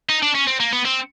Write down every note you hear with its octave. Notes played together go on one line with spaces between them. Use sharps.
D#4
D4
C#4
C4
A#3
B3
C4